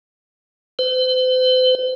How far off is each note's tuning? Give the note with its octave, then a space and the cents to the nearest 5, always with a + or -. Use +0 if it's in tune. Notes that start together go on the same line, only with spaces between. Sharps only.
C5 -40